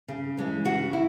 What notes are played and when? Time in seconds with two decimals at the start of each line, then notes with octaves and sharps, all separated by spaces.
0.08 C#3
0.37 E3 G#3 C#4
0.65 C#3 F#4
0.93 E4